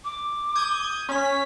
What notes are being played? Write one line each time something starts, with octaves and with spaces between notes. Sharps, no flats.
D6
D#6 G6 G#6
C#4 C#5 B6